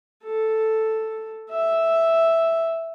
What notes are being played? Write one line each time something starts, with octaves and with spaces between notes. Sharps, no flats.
A4
E5